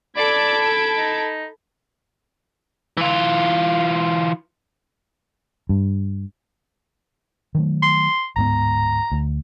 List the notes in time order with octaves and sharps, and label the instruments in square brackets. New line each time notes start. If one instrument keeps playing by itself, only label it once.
[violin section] A4 A5 D7 [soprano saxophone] D5 [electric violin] B5 G#6
[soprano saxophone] D#4
[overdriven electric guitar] E3 F4
[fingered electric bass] G2
D#3 F#3 A3
[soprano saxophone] C6
[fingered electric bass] D1 G#2 B3 [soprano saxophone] A#5
[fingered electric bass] D2